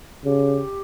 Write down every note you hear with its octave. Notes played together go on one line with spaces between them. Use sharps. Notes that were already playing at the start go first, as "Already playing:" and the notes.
C#3 G4